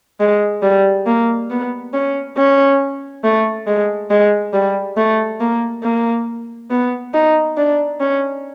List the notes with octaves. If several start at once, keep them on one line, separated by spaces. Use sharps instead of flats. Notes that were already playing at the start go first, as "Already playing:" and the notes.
G#3
G3
A#3
B3
C#4
C#4
A3
G#3
G#3
G3
A3
A#3
A#3
B3
D#4
D4
C#4